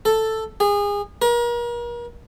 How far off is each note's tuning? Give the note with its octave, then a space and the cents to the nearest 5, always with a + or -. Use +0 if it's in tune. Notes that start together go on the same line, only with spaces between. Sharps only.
A4 +5
G#4 -30
A#4 +40